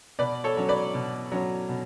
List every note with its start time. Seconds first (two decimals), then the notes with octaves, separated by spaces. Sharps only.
0.19 B2 B4 D5
0.44 A4 C#5
0.57 F#3 C#4
0.69 B4 D5
0.94 B2
1.32 F#3 C#4
1.69 B2